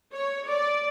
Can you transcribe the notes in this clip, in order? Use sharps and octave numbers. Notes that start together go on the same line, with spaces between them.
C#5
D5